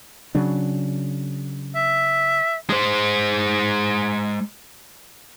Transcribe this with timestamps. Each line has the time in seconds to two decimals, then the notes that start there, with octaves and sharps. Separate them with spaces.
0.35 C#3 F#3 D4
1.75 E5
2.70 G#3 C5